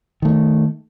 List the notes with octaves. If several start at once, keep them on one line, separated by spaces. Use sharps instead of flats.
D#3 A3